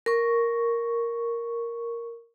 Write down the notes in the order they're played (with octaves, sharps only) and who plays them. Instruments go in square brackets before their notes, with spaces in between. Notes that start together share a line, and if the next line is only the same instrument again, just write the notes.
[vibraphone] A#4 C#6